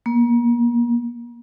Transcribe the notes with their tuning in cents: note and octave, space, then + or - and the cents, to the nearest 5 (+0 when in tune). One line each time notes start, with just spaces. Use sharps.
A#3 +35